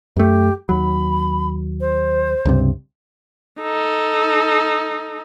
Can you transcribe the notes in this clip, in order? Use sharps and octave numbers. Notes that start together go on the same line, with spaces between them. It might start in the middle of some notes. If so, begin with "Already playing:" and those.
F#2 A3 G4
D#2 F#3 B5
C5
C#2 G2 C3
D#4 A4